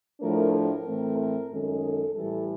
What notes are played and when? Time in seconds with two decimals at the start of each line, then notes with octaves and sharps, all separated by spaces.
0.21 A2 F3 A3 D4 A#4
0.54 A#4
0.85 A2 E3 A3 C4
1.18 A#4
1.51 F#2 D#3 G#3 C#4 A4
1.83 A4
2.15 A2 E3 G3 A4